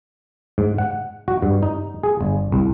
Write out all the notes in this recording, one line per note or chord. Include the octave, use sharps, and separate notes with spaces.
G#2
F#5
F#4
G2
D#4
G#4
G1
C2